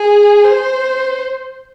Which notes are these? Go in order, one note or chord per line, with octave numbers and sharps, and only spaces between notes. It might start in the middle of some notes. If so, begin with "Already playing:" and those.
Already playing: G#4
C5